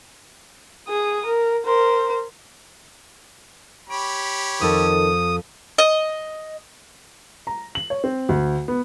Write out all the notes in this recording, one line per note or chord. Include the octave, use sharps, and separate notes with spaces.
G#4 D#6
A#4
A#4 C5
G4 C#5 B5 D7
F2 D#3 F3 A4 D#6
D#5
A#5
F#7
C#5
C4
D2
B3